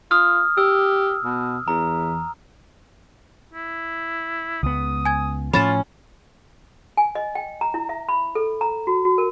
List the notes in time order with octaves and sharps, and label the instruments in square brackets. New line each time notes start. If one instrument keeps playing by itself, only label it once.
[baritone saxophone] F4 [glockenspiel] D#6 F6
[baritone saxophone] G4 [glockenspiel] E6
[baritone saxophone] B2
[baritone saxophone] E2 [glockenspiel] A#5
[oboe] E4
[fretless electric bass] C#2 B3 [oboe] D#6
[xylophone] G#5 G#6
[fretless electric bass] A2 F3 [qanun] C#4 [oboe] F4 [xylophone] B5 A6 E7
[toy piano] G#5
D#5
G5
A#5
E4
E5
B5
A4
A#5
F#4
F#4
A#4